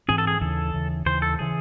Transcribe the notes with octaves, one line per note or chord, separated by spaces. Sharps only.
G#2 E3 C4 G#4
A4
G#4
D#2 C#3 E3 A4
D#2 C#3 E3
D#2 C#3 E3 C5
A4
C#3 E3 G#4